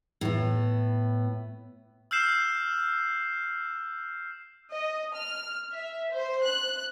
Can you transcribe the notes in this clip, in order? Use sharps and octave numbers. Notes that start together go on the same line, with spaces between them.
A2 B3
E6 F6 G6 C7 E7
D#5
F6
E5
C5
F#6